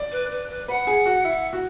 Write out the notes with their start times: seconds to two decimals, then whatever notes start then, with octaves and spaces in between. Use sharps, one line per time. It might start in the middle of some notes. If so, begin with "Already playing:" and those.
Already playing: D5
0.12 B4
0.31 B4
0.50 B4
0.68 B4 F#5
0.87 G#4
1.06 F#4
1.24 E4
1.53 F#4